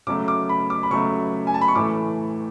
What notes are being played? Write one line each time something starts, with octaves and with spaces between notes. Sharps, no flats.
C#3 F#3 A3 D6
D6
B5
D6
B5
C#3 F#3 A3 C#6
G#5
A5
B5
C#6
A2 E3 A3 D6